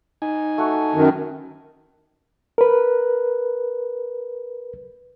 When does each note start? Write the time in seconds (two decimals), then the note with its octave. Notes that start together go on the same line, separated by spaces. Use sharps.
0.22 D#4 G#5
0.58 A3 F#4
0.95 F#2 D#3
2.58 A#4 B4